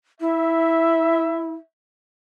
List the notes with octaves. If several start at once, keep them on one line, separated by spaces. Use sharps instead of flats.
E4 E5